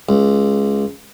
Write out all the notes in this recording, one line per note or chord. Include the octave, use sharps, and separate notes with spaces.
C#2